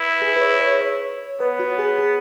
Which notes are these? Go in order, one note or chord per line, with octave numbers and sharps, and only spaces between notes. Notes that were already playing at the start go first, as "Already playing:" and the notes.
Already playing: E4 B4
G#4
B4
C#5
C#5
C#5
B3 B4
F#4
G#4
G#4